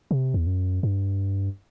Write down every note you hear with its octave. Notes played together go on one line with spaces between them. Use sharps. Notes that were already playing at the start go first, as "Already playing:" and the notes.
C3
E2
F#2
G2